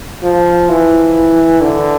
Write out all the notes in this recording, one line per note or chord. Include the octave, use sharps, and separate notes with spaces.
F3
E3
D3